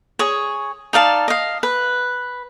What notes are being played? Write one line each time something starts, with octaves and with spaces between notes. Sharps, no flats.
G#4 C#5
D#4 D5 F5 A5
D#5 F5
B4